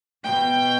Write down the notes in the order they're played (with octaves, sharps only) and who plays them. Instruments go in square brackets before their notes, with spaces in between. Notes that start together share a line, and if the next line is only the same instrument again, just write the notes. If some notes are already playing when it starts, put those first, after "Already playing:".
[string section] B2 G5